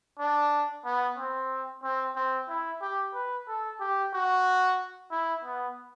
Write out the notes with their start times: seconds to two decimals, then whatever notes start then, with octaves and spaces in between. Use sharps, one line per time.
0.19 D4
0.85 B3
1.18 C4
1.83 C4
2.15 C4
2.49 E4
2.82 G4
3.14 B4
3.48 A4
3.80 G4
4.13 F#4
5.11 E4
5.44 B3